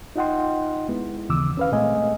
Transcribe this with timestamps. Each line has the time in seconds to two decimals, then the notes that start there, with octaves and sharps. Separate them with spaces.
0.16 D#4 F4 D#5 F#5 G5 C6
0.89 G#3 B3 E4
1.29 D#2 C#3 E3 D6 E6
1.57 C#4 B4 F5
1.72 A#2 G#3 A3 C4 D#5 G#5